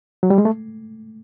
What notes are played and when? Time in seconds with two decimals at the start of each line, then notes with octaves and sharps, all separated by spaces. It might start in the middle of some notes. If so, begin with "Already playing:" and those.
0.23 F#3
0.30 G3
0.38 G#3
0.45 A3